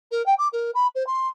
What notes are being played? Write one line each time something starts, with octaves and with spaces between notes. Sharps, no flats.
A#4
G5
D6
A#4
B5
C5
C6